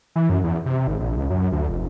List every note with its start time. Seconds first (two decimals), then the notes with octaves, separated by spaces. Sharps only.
0.16 E3
0.30 F#2
0.44 E2
0.66 C3
0.87 G#1
1.00 A#1
1.17 C#2
1.30 F#2
1.52 D2
1.69 F1